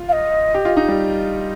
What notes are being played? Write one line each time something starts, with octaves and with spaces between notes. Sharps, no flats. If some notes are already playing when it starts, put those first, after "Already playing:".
Already playing: F4
F5
D#5
G4
F4
D#4
G3